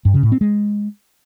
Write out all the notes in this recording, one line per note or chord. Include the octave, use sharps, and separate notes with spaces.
G2
C#3
A2
C4
G#3